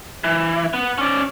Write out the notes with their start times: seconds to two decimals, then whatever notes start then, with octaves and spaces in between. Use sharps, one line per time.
0.24 E3
0.74 B3
0.98 C#4 D5